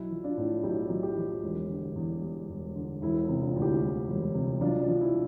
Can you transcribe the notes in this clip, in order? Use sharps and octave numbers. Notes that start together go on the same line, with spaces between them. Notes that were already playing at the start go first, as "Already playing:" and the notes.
Already playing: B1 E4
F3
D4 F4
A2
B1 E4 G4
B1
E4 G4
F3
E1
D3
E2
G3
E1
D3
E1 E4
E4
C3
D4 F4
D2
E4 G4
G3
E1
C3
B1 D4 F4
D4
F3
E4